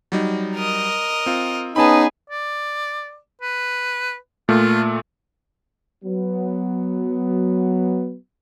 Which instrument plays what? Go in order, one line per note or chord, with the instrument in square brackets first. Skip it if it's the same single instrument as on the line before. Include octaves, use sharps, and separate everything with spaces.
[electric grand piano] F#3 G3 D#4
[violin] A#4 D#5
[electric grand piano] C4 F4
[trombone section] B3 C#4 D#4 [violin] G#4 B4 [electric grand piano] A5 B5
[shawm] D5
B4
[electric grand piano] A#2 A3 [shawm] F4
[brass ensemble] F#3 B3